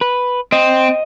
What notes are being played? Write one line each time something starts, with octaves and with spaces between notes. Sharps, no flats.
B4
C4 D#5